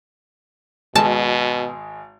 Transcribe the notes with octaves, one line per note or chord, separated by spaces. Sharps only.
G#1 B2 G#3 A5